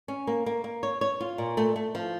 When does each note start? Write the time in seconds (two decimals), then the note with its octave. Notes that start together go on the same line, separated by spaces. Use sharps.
0.08 C#4
0.27 A#3
0.46 A#3
0.64 A#3
0.83 C#5
1.01 C#5
1.20 F4
1.38 A#2
1.57 A3
1.76 A3
1.95 F3